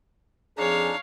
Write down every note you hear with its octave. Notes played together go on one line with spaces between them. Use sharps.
F2 F3 D4 D#4 G#4 C#5 F5 A5